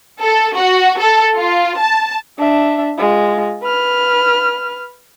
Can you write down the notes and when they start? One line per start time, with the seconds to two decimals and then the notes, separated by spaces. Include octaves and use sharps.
0.21 A4
0.56 F#4
0.99 A4
1.36 F4
1.77 A5
2.39 D4 E5
2.98 G#3 F4
3.63 B4 F6